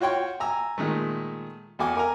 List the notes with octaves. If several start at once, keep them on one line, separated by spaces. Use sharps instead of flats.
F4 F#4 C#5 G5 C6
G#5 A#5 E6
A#2 D#3 G#3 A3
E2 F#4 A4 G#5 D6
A#4 G#5 A#5